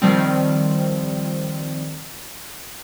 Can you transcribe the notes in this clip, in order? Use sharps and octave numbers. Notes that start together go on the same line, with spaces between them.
D#3 F3 G3 C4